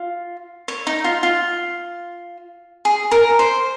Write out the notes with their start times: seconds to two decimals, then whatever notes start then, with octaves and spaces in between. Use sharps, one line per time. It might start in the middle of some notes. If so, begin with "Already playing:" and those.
Already playing: F4
0.68 C#5
0.87 D#4
1.04 F4
1.23 F4
2.85 G#4
3.11 A#4
3.39 C5